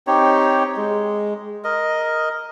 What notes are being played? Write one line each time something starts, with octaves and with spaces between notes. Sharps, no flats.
C4 D#4 G4 C#5
G#3
A#4 D#5